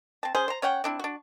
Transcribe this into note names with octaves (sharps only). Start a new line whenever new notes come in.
C4 A5
C#4 G#4 C5
C5 A#5
C#4 C#5 F#5 G5
C4 D4 E4
D4 F#4